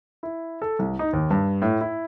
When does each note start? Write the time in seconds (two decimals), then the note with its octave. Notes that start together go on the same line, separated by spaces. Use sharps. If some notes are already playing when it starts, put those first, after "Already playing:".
0.23 E4
0.62 A4
0.79 C2
0.99 D#4
1.13 D#2
1.31 G2
1.62 A2
1.81 E4